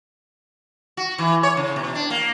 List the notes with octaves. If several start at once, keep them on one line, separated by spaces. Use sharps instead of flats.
F#4
E3
C#5
C#3
B2
D4
A#3